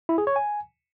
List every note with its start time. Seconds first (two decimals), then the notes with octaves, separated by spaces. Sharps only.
0.09 E4
0.18 G#4
0.27 C#5
0.36 G#5